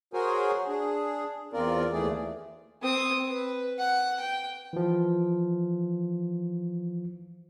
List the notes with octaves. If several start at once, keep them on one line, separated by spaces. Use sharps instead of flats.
F#4 G#4 A#4 C5 C#5 G#5
D4 G#4
E2 C4 F4 A#4 D5
D#2 E3 A3 G#4 D5
C4 D#6
B4
F#5
G5
E3 F3